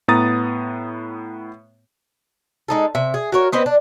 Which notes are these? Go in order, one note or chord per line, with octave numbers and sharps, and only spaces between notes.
A2 B3 A#5 D#6 A6
G#3 D#4 A4
C3 E5
G#4
F#4 A#4 C#5
B3 C4 B4 D#5
D4